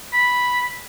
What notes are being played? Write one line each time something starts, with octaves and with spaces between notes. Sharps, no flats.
B5